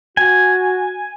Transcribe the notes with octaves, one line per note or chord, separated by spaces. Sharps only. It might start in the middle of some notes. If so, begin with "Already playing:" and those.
F#4 G#5